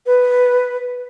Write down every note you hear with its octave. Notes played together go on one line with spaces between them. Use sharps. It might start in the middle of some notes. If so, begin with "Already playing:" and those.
B4